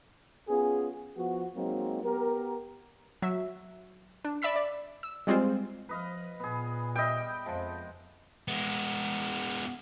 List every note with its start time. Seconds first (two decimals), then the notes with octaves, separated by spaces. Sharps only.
0.48 B3 C#4 F4 G#4
1.15 F3 B3 F#4
1.56 F#3 G#3 A#3 C4 D#4
2.04 B3 G4 A#4
3.22 F#3 E5
4.24 D4
4.42 D5 E5 B5 E6 B6
4.56 D5
5.03 E6
5.27 G3 G#3 C4 F4 C5
5.89 F3 B4 D#5 F5
6.40 A#2 B3 G#4
6.95 G3 D#5 E5 G5
7.46 F2 F3 G#3
8.48 G#3 B3